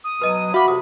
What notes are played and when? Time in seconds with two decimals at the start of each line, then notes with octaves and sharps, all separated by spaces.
0.04 D#6
0.21 B2 F#3 B4 D#5 D#7
0.54 F#4 B4 E5 F5 B5 D6
0.68 C2 F2 C3 D#6